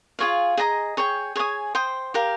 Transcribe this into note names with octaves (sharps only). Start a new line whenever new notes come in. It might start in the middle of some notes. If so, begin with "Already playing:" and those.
F4 G#4 C#5 F5
G#4 D#5 A#5 D#6
G#4 C#5 G5
G#4 C#5 G#5 D#6
C5 G5 C6 D#6
G4 A#4 F5